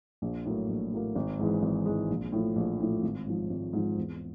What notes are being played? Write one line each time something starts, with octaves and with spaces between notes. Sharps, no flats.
A#1
A2 F#3 A#3
A#1
A2 F#3 A#3
G#1
G#2 E3 G#3
G#1
G#2 E3 G#3
A#1
A2 F3
A#1
A2 F3
G#1
G#2 F3
G#1
G#2 F3
E2